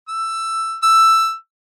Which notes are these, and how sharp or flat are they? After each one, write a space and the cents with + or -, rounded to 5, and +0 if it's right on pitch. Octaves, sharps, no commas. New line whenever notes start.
E6 +10
E6 +10